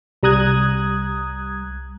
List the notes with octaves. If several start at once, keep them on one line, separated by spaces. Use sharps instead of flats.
C2 G3 A#5 D#6 F#6 G#6